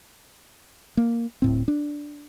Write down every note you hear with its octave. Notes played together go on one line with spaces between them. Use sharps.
A#3
D1 A2 C4
D4